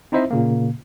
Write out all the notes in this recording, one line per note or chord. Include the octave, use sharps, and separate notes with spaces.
C4 D#4 E4 C5 D#5 E5
A#2 C#3 A#3